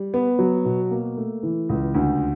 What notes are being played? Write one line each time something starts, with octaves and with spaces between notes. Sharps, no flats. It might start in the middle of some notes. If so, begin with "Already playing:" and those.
Already playing: G3
B3
F#3
B2
A#3
A3
E3
C#2
D2